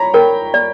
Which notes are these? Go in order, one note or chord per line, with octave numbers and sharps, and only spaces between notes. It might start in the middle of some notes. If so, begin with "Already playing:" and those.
Already playing: C#5 A#5 B5
A#4 G5
D5